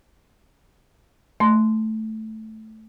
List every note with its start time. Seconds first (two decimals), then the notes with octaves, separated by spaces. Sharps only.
1.40 A3 C6